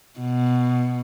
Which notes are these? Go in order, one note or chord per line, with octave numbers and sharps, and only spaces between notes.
B2